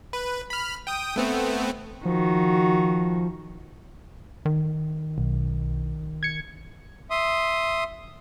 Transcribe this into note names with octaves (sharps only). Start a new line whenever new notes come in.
B4
B5 F6
G5 D#6
A3 B3 C4
D#3 F3 F#4
D#3
B1
G#6 C#7
E5 C6 D#6